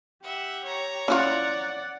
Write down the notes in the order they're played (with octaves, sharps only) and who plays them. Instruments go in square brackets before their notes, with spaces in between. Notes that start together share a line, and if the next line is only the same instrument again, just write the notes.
[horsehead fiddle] G4 [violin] E5 F#5
[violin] C#5 A#5
[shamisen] C#4 E4 F4 [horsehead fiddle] D5 F#5